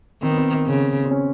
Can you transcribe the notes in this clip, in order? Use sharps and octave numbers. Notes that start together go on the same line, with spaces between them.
D#3 C4
B3
C4
C#3
C4
C#4